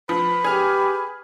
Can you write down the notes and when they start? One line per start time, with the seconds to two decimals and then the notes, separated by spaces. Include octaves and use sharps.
0.09 F3 B4
0.44 G4 G#4 F6